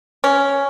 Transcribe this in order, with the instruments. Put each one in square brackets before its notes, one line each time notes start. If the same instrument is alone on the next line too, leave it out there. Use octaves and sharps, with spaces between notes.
[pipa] C#4